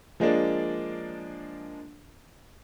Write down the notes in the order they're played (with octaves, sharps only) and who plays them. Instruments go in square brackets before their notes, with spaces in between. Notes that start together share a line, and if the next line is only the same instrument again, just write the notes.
[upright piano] F3 G#3 A#3 D4